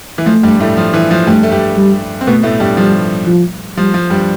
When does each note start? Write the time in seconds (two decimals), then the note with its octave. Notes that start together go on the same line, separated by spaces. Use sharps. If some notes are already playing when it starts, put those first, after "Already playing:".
0.18 E3
0.26 F3 A3
0.43 G2 G3
0.60 A2 A3
0.77 F3
0.94 E3
1.11 F3
1.27 G2 G3 A3
1.43 A3
1.51 G2 G3
1.77 G3
2.21 C4
2.27 B2 A3 B3
2.43 A2 A3
2.60 G2 G3
2.77 F3 G3
3.27 F3
3.77 F3 G3
3.94 F3
4.10 G2 G3